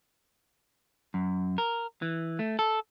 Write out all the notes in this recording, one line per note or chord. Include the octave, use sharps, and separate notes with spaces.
F#2
A#4
E3
A3
A4